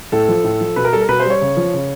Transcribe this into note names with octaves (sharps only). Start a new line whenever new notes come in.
A2 A4
F3
A2
F3
B2 B4
A#4
G3 A4
A#4
B2 B4
C5
G3
C#5
C#3
F3
C#3